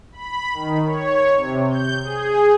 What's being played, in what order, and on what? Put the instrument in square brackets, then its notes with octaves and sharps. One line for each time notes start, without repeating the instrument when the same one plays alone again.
[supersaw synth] B5
D#3
C#5
C3
G6
G#4